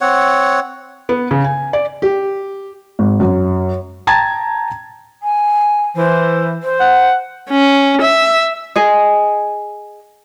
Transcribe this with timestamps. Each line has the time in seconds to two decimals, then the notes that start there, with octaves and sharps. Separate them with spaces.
0.01 C4 C#5 F#5
1.09 B3
1.31 C#3
1.44 G#5
1.73 D5
2.02 G4
2.99 G#1
3.20 F#2
4.07 G5 A5 A#5 G#6 A6
5.23 G#5
5.96 E3 C5
6.63 C5
6.80 F#5
7.50 C#4
8.01 E5
8.76 G#4 D#5